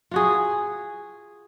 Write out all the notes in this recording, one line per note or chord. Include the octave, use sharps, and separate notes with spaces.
F4 F#4 G#4